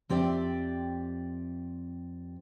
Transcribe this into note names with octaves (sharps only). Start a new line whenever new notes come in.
F2 C4 G4 D5 E5